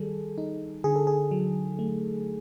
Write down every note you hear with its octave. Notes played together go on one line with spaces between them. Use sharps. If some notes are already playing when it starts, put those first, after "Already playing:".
Already playing: D#3 G3 G#4 A4
D#4
D3 G#4
A4
G#4
F#3
A3